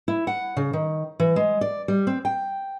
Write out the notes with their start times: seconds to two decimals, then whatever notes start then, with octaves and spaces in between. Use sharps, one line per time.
0.08 E4
0.27 F#5
0.57 C#3
0.73 D#3
1.20 E3
1.36 G#3
1.61 D5
1.88 G3
2.07 C4
2.25 G5